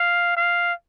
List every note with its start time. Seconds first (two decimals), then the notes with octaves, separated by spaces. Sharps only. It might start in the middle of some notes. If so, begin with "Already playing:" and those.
Already playing: F5
0.37 F5